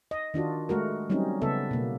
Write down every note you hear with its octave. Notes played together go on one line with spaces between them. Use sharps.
D#5
D#3 D4 F4 F#4
G#3 A3 F#4 A#4
F#3 G3 C4 C#4 D#4
C#3 B3 A4 E5
B2 A#3